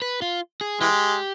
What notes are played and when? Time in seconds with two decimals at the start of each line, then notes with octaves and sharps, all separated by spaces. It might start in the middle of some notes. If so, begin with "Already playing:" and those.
0.02 B4
0.22 F4
0.61 G#4
0.80 E3 G#3 G4